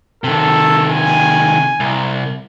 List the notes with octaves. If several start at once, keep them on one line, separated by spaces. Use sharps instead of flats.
C3 D#3 A4
G#5
C2